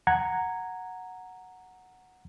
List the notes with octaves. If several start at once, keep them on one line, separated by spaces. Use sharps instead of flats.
F#5 A#5 G#6